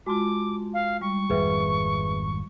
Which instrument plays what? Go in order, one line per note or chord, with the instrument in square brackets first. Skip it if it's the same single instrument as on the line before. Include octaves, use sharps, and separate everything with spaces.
[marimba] G#3 F4 [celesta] F#4 A5 C6 [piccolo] D6
[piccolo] F5
[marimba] G3 [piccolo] C#6
[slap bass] G#1 F2 [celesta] G#4 B4 E5